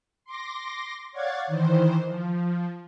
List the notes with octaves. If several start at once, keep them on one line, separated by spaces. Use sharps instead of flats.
C6 D6 A#6
C#5 D5 F5 F#5 G#6 A6
D#3 E3 C5
F3